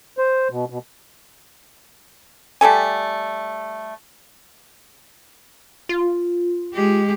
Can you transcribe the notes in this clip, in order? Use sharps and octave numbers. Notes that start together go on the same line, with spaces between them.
C5
B2
B2
G3 A3 A4 G#5
F4
G#3 G4